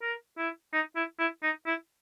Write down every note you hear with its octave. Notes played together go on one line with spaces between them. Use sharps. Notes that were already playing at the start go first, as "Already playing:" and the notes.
A#4
E4
D#4
E4
E4
D#4
E4